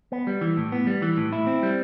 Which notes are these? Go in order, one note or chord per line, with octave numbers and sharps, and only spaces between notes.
B3
G3
E3
A2
B3
G3
E3
A2
E4
C4
G3